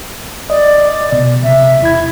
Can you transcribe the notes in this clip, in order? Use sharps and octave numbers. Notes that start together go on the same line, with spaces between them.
D5 D#5
B2
C3 E5
E2 E4 G#6